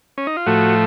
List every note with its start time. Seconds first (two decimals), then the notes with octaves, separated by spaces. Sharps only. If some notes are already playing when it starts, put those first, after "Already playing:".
0.18 C#4
0.27 D#4
0.37 F4
0.46 A2 F3 A3 F#4